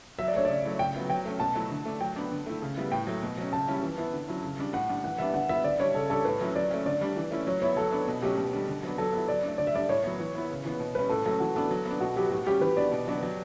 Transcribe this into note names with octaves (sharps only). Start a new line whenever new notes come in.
F#3 E5
D5
A3 D4 C#5
C#3 D5
F#3 A3 E4
C#3 G5
F#3 B3 E4
F#3 G5
A3 C#4
B2 A5
F#3 A3 E4
D3
A3 D4
F#3 G5
B3 D4
D3
A3 E4
C#3
G3 B3 E4
A2 G5
F#3 A3
B2
F#3 C#4
C#3 A5
G3 C#4 E4
E3
B3 E4
D3
F#3 C#4 E4
C#3
G3 D4
A2 F#5
G3 D4
E3 F#5
G3 B3 D4 E5
D3 F#5
G3 B3 E4 E5
D3 D5
G3 D4 C#5
C#3 A4
G3 D4 A4
A2 B4
F#3 C#4 E4
F#3 D5
A3 C#4
D3 D5
G3 D4
E3
A3 C#4 E4
F#3 C#5
B3 E4 C#5
F#3 A4
B3 D4
B2
F#3 A3 C#4 G4
B2
G3 D4
D3
F#3 B3 D4
F#3 A4
B3 E4
F#3 D5
A3 D4
D3 D5
E5
G3 D4 D5
A2 C#5
F#3 B3
E3
B3 E4
C#3
E3 B3
B2
G3 C#4 B4
A2 A4
F#3 A3 C#4 A4
E3 F#4
B3 D4 A4
F#3
B3
D4
B2 F#4
F#3 B3 G4
A2 F#4
G3 C#4 G4
E3 B4
B3 D4 D5
B2
F#3 B3 D4
F#3